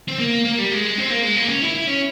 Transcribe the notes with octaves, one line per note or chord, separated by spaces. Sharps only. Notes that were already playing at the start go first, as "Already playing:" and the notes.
C4
A#3
A#3
G3
G#3
C4
A#3
G#3
A#3
C#4
E4
E4
C#4